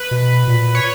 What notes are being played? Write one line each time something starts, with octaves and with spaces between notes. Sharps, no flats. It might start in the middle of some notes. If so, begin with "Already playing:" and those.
Already playing: B4
B2
A#2
C#5